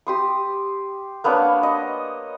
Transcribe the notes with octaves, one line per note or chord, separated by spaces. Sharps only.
G4 C6 D#6
A#3 B3 D4 C#5
D#5